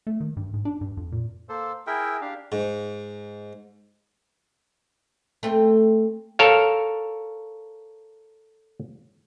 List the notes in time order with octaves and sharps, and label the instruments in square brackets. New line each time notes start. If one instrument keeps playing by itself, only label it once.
[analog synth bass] A3
D#3
G2
G#2
D4
G2
F2
A#2
[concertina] A#3 A4 C5
[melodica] E4 A#4 G5 [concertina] G#4 E5
[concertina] D4 G4 F5
[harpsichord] G#2
[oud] A3 C4
[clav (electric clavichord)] A4 A#4 C#5 F5